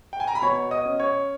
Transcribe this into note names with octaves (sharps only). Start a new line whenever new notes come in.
G5
G#5
A#5
B5
B2 C#5 C#6
D#5 D#6
C#4
C#5 C#6